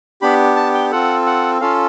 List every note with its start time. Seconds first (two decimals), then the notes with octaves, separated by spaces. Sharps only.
0.22 B3 D4 G4 B5
0.56 A5
0.74 G5
0.91 C4 F4 A4 F#5
1.26 F#5
1.61 C#4 F4 A4 F5